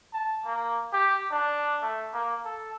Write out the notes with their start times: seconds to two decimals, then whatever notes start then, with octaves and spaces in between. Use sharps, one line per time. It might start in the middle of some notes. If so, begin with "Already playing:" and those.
0.14 A5
0.45 A#3
0.93 G4
1.31 D4
1.82 A3
2.13 A#3
2.45 A4